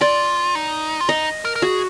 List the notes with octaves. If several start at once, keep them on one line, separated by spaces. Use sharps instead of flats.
F4 D5
D#4
F4
D#4 D#5
A#4
A#4
F#4 G#4